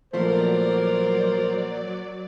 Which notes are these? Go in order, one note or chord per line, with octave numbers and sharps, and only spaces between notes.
A#2 F3 F#3 A3 A#4 C5 D5